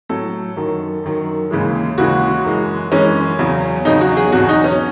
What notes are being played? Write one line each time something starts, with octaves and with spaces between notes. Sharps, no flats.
A2 F#3 A4
F#2 D#3 F#3
F#2 D#3 F#3
D#2 C#3 E3 G#3
D#2 C#3 E3 G#3 F#4
F#2 E3 G#3
F#2 E3 G#3 C#4
E2 C#3 F#3
E2 C#3 F#3 D#4
F#4
G#4
E2 B2 F#3 F#4
D#4
C#4